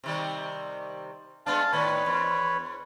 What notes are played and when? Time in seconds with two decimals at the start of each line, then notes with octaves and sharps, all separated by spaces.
0.04 C3 D#3 G3
1.46 G#3 B3 D4 F5 A5
1.72 A2 D#3 B3 B4 C#5
2.06 E2